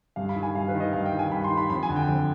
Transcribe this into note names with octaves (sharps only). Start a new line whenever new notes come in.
G2 F5
B5
D#3
G#5
G2 F5
B4
D#3
D#5
G2 F5
G5
D#3
G#5
G2 B5
C6
D#3
B5
F2 B5
G#5
D3
G5
F2